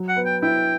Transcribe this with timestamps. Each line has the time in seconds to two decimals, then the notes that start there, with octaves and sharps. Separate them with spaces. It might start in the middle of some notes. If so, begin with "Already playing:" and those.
Already playing: F#3
0.08 F#5
0.16 B3
0.25 G5
0.42 E4 G5